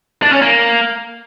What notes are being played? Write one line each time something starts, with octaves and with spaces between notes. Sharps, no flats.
D4
C#4
A#3